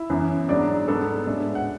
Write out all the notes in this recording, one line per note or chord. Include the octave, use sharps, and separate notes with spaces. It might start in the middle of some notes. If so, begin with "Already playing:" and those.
Already playing: E4 E5
F#2 E3 B3
G#2 F#3 B3 D4 D5
G#2 F#3 B3 D4 A4
A2 G#3 D4
F#5